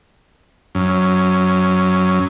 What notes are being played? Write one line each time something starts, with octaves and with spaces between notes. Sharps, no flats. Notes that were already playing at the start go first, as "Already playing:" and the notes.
F#2